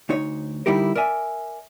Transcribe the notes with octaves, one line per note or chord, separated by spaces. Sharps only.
D2 D#4 C#5
D3 G3 D#4 E4 G4 A#4
A#4 D5 E5 G#5